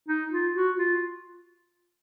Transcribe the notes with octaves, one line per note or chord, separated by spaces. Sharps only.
D#4
F4
F#4
F4